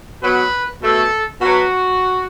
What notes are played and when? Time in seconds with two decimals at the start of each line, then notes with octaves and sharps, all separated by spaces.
0.22 B2 F#3 B3 B4
0.81 B2 A3 A4
1.41 B2 F#3 B3 F#4